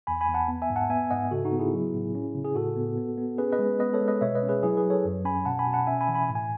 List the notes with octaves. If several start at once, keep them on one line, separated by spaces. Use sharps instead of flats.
E2 G#5 B5
G#5 B5
E2
F#5 A5
B3
E5 G#5
G#2
F#5 A5
B3 E5 G#5
G#2 D#5 F#5
C#3 F#4 A4
D#4 F#4
B3
E4 G#4
F#3
A2
C#4
C#3
G#4
A2 F#4 A4
B3
B3
B3
C#4 G#4 B4
B4 D#5
G#3
B3 B4 D#5
A4 C#5
G#3
B4 D#5
B2 C#5 E5
B4 D#5
C#4
G#4 B4
F#3 E4 G#4
G#4 B4
F#3
A4 C#5
F#2
C#4 G#5 B5
B2 F#5 A5
G#5 B5
B2
F#5 A5
C#4 E5 G#5
G#5 B5
E3
G#5 B5
A2
G#5